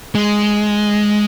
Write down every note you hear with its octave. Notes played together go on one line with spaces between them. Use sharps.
G#3